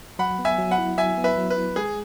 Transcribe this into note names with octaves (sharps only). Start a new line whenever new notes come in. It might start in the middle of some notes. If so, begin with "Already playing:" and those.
F#3 F#5 B5
B3
E5 G#5
F#3
F#5 B5
E4
F#3 E5 G#5
B3
B4 E5
F#3
B4
E4
G#3 G#4